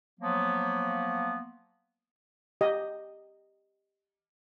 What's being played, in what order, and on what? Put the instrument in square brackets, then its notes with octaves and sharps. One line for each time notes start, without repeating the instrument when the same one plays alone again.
[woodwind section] F3 F#3 A#3 B3
[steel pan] G4 D#5